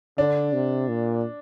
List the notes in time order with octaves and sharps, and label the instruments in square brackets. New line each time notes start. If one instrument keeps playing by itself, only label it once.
[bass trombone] D3 [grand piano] D4
[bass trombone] C3
A#2